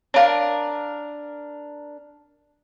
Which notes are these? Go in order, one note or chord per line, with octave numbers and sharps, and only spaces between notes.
D4 A#4 C#5 F5